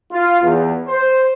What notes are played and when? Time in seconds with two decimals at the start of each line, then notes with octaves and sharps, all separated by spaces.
0.12 F4
0.42 E2
0.87 C5